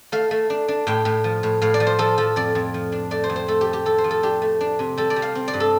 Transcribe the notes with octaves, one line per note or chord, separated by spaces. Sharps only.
A3 F5
A3
D4
D4
A2 G5
A2
F3
A2
A2 F5
D5
F3
C5
F3 A4
F3 A4
F2 D5
F2
F3
D4
A3 D5
C5
F2
C5
A3 A4
G4
A3
G4
F2 A4
C5
F3
A4
D4 G4
A3
D4
C3
G3 A4
D5
G3
F5
C4
D5
G2
A4